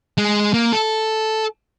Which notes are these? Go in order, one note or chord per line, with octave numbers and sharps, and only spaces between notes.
G#3
A#3
A4